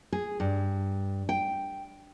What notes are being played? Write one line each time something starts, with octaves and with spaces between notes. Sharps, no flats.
G#4
G2
G5